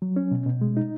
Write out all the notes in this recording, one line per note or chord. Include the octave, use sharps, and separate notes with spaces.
F#3
C#4
B2
B2
G#3
D#4